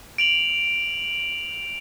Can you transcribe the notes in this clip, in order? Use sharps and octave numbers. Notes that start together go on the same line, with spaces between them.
D7 F7 F#7